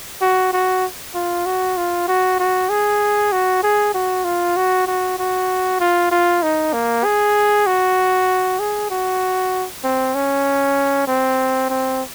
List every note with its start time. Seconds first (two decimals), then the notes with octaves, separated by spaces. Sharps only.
0.22 F#4
0.53 F#4
1.15 F4
1.46 F#4
1.77 F4
2.08 F#4
2.39 F#4
2.70 G#4
3.32 F#4
3.64 G#4
3.94 F#4
4.25 F4
4.57 F#4
4.87 F#4
5.19 F#4
5.81 F4
6.11 F4
6.43 D#4
6.73 A#3
7.04 G#4
7.67 F#4
8.60 G#4
8.91 F#4
9.84 C4
10.15 C#4
11.08 C4
11.70 C4